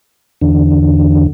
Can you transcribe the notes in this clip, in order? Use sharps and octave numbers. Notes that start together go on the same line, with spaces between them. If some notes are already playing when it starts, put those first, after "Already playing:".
E2 D3